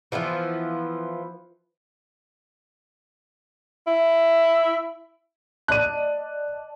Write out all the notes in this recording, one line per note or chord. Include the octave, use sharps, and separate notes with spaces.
E3 F3 B3 F4
E4
D5 D#5 A5 F#6 D#7